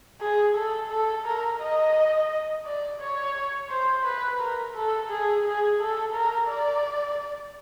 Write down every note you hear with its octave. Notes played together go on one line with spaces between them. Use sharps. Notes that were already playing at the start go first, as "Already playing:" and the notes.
G#4
A4
A4
A#4
D#5
D5
C#5
C5
B4
A#4
A4
G#4
G#4
A4
A#4
D5